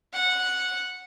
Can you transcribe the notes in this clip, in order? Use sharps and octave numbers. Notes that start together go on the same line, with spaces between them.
F#5